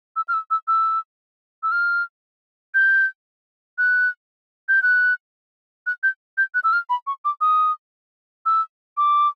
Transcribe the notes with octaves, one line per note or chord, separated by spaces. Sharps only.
E6
F6
E6
E6
E6
E6
F6
G6
F#6
G6
F#6
F#6
G6
G6
F#6
E6
F6
B5
C#6
D6
D#6
E6
D6